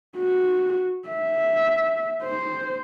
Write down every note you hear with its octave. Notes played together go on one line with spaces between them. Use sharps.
F#4
E5
C5